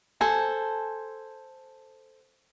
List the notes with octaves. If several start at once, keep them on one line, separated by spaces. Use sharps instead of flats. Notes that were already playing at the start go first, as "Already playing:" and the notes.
A4 C5 G#5